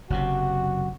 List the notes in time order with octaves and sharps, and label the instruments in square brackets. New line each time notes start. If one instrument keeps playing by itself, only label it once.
[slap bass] F#1 F#2 C3 [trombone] F#4